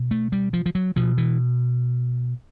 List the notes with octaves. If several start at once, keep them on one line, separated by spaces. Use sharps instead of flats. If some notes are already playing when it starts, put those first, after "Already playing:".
Already playing: B2
A3
G3
F3
F3
F#3
B2 F3
E3